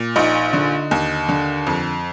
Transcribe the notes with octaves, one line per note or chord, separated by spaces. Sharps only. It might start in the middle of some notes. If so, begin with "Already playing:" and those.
Already playing: A#2
A#1 D#4
D3
D#2
D3
F2